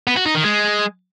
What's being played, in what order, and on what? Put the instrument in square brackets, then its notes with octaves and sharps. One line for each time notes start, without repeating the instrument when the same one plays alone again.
[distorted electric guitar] B3
F#4
D#4
D#3
G#3